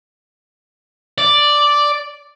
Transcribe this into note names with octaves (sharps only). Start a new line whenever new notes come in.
D5